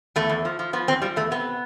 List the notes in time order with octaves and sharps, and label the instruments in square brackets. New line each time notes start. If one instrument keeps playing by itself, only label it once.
[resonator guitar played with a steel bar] E2 A3
E2
F3
F3
F3 B3
E2 C4
F3 G3
E2 A3
C3 B3